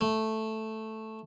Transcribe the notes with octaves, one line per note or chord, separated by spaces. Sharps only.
A3